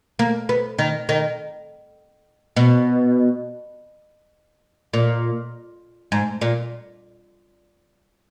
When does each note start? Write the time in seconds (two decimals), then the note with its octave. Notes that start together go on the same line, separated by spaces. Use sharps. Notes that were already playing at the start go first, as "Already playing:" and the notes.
0.19 A#3
0.49 B3
0.79 D#3
1.09 D#3
2.57 B2
4.93 A#2
6.12 G#2
6.41 A#2